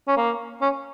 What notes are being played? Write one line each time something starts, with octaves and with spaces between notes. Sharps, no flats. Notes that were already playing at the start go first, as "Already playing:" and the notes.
C#4
A#3
C#4